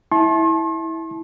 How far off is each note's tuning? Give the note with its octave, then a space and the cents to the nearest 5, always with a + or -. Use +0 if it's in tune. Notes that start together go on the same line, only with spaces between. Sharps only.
E4 -15 A5 -20 C6 +45